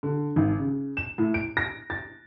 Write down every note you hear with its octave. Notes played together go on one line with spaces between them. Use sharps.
D3
G#1
C#3
E7
A2
D7
A#6
A6